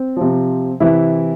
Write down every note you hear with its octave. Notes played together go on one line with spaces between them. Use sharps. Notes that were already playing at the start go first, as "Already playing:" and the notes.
Already playing: C4
C3 F3
C3 E3 E4